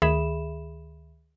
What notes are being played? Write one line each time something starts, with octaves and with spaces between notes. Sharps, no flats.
D2 D#3 G#4 E5 B5 E7